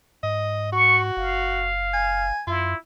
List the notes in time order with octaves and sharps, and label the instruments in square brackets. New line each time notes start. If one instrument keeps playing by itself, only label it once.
[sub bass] G#2 [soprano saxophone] D#5
[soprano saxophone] F#4 [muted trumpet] C#6
[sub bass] F#1 [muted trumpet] F5
[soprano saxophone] G#5
[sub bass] F#2 [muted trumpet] E4 [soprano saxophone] F4